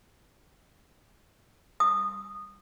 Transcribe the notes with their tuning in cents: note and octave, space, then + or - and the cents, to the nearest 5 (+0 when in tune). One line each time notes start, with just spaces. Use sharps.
D#6 -20